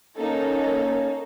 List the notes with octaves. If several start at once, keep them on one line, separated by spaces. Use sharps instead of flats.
A#3 C#4 D#4 A4